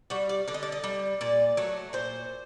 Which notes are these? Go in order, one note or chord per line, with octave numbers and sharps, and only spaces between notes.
G3 F#4
D5
D3 D5
D#5
D5
D#5
G3
A#2 D5
F#3 A3
A#2 C5